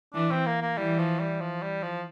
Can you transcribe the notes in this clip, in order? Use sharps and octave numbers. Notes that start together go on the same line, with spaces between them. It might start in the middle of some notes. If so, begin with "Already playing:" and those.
E3 D4
C4
A#3
A#3
E3 G3
F3
G3
F3
G3
F3